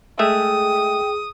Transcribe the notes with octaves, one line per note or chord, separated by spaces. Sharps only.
G#3 A3 G#4 E5 G5 D#6